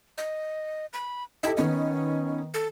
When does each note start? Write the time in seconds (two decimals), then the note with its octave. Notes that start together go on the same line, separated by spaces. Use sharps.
0.18 D#5
0.93 B5
1.43 D#4 E4 G4 A4
1.57 D#3 B3 C#4 D#4
2.54 A4